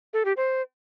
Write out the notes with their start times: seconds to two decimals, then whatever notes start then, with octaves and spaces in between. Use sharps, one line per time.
0.14 A4
0.25 G4
0.37 C5